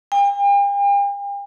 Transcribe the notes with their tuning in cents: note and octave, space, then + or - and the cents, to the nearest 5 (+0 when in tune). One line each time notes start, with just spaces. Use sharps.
G5 +45